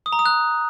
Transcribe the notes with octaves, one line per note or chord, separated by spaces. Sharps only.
D#6
A#5
D#6
F#6